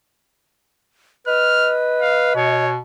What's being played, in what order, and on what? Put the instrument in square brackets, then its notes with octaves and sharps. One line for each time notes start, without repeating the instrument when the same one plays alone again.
[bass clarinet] B4 [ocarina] D#5 [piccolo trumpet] F6
[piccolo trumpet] F5
[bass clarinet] B2 [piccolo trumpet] C#5